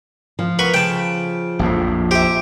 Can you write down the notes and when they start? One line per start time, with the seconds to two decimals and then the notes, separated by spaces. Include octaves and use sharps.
0.39 F3
0.59 B3 A#4 B5 C#6
0.74 C#3 G5 A5
1.59 A#1 F2 A2
2.11 G4 C5 E5